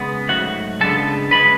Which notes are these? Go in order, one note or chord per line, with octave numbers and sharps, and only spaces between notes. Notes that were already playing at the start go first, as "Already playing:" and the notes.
Already playing: C#3 G#3 B3
G#2 F#3 A3 F#4 F#5
C#2 C#3 G#3 B3 D4 A4 A5
F#2 C#3 G#3 B4 B5